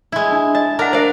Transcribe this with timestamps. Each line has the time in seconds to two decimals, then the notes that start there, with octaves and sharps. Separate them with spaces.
0.12 G#3 E4
0.32 D4
0.55 D#5 A5
0.79 D4 A#4 F#5 A#5
0.93 A#4 C5 D5 E5 F5